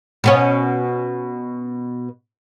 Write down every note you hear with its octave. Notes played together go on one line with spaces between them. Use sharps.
B2 B3 C#4